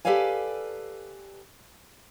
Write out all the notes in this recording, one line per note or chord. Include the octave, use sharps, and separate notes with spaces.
G4 A4 B4 D5 F5 G#5